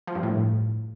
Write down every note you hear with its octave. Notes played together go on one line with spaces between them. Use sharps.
F3
G2
A2